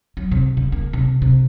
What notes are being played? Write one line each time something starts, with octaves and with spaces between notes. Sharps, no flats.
F#3
C3
C#3
A#3
C3
C3